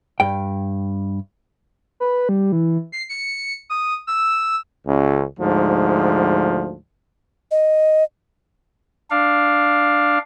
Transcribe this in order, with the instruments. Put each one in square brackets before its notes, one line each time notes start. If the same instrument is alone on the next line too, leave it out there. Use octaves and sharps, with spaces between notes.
[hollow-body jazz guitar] G2 G5
[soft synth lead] B4
G3
E3
C7
C#7
D#6
E6
[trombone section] C#2
D2 G#2 F3
[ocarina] D#5
[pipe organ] D4 F5